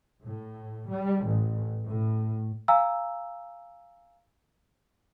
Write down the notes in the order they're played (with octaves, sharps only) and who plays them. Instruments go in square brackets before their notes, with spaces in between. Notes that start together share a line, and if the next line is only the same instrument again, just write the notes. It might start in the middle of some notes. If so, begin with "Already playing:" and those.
[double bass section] A2
G3
A1
A2
[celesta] F5 G#5 A#5 E6